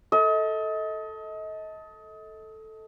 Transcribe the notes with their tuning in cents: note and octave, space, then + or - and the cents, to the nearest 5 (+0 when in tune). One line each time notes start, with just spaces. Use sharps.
A4 +0 D#5 +30